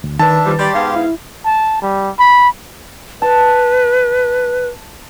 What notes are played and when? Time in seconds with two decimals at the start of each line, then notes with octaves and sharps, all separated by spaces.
0.04 D2
0.19 D#3 D4 B4 E5 A5
0.46 F3 G3
0.59 G3 G4 D5 C6
0.75 G#2 B3 F5
0.96 E4
1.46 A5
1.82 G3
2.19 B5
3.22 B4 A5